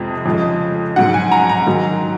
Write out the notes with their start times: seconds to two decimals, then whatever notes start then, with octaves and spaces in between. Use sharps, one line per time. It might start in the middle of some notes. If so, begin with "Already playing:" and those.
Already playing: F2 C3 F3 G#3
0.26 F2 C#3 F3 G#3
0.96 G#2 F#3 F#5
1.14 G#5
1.32 A#5
1.49 A#5
1.67 G#2 D#3 F#3